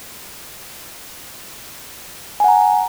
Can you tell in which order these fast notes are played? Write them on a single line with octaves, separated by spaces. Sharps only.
G#5 F#5 A#5